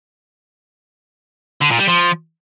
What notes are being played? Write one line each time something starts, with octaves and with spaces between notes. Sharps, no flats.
D3
A#2
G3
F3